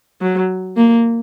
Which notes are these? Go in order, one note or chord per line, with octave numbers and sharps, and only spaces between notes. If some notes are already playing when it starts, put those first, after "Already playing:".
F#3
A#3